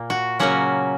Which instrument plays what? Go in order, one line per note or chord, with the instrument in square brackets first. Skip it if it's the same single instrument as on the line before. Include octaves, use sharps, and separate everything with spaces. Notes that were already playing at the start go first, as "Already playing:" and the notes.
Already playing: [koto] A#2 A#3
F#4
C#3 F#3 A#3 C#4 F#4